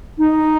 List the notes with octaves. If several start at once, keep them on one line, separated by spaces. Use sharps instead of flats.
D#4